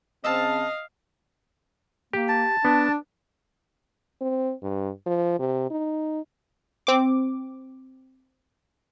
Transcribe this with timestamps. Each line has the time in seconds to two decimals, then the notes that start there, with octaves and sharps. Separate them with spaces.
0.24 C#3 C4 D#5 F5 A5 E6
2.13 A#3 G4
2.28 A5
2.65 B3 D4
4.21 C4
4.62 G2
5.06 F3
5.39 C3
5.70 D#4
6.87 C4 D6